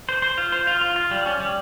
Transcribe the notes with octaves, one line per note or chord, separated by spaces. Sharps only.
C5
C5
F4
C5
F4
F4
F4
G3
C#4
G3